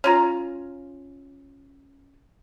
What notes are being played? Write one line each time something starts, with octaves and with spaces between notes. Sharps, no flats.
C#4 F4 A#5